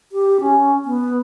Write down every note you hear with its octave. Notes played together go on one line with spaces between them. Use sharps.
G4
C#4
B3